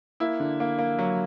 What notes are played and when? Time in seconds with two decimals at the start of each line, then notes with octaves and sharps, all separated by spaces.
0.20 A#3 E4
0.40 D3
0.60 A#3
0.79 A#3
0.99 F#3